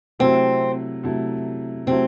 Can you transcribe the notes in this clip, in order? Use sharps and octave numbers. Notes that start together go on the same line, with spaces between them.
C3 F#3 A3 C4 E4
C3 F#3 A3 E4
C3 F#3 A3 C4 E4